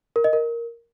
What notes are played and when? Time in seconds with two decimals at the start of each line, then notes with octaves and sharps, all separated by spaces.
0.16 A#4
0.24 D#5
0.33 A#4